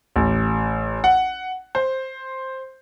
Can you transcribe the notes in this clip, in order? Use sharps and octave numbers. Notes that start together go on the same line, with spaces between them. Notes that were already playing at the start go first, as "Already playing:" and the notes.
A1
F#5
C5